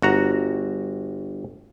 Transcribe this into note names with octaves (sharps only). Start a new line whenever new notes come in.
G1 F#4 A#5